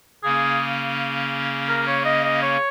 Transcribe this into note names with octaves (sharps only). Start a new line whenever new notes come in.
C#3 A#3 C#4 G#4
A#4
C#5
D#5
D#5
C#5